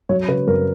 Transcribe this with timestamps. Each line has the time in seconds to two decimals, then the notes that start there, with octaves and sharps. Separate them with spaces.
0.09 F#3 C#5
0.28 C#3 B4
0.47 F#2 A#4